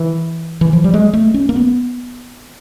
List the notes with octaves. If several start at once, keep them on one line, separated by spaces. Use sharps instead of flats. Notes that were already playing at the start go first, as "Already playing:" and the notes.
Already playing: E3
E3
F3
G3
G#3
A3
C#4
A#3
B3